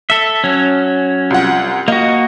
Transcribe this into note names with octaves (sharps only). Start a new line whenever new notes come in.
A4 E5
F#3 C#4
C2 F4 F#5
A#3 F#4 D#5